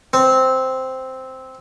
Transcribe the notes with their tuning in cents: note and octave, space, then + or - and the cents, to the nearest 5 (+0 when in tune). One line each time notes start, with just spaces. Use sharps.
C4 -5